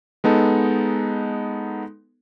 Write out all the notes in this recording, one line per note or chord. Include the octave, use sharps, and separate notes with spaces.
G#3 B3 D#4 A4